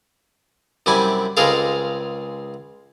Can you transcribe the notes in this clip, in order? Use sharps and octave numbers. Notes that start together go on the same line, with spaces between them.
F#2 C3 G3 E4 G#5 D6
C#2 G#3 C4 A4 A#4 F5